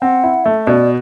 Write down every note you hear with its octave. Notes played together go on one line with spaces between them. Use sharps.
C4 F#5
E4
A3 E5
B2 D5